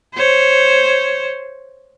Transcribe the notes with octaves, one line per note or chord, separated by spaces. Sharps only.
C5 C#5